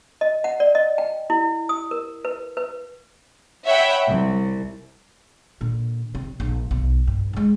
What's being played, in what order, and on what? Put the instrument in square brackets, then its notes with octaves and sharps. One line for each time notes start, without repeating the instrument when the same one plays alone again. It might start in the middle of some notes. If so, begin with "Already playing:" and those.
[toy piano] D#5
F#5
D5
D#5
G5
E4
D#6
A#4
B4
B4
[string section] C#5 E5 F#5 G5 B5
C2
[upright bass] A#2 D3
C3
A#1
B1
G2
D3 G#3